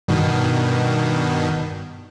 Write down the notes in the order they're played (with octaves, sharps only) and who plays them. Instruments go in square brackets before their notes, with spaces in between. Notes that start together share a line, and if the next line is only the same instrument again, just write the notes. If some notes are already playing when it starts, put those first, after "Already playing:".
[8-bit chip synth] G2 B2 D#3